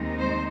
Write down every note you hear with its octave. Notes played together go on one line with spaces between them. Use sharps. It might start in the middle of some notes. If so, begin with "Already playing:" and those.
Already playing: D#2 D#3 G#3 C4 D#4
C5